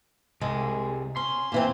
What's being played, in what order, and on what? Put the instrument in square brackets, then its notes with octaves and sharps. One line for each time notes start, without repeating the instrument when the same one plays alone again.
[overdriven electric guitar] C2 [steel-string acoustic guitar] G#3
[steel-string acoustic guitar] C#4 [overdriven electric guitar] C6
[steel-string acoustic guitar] A#2 E3 C4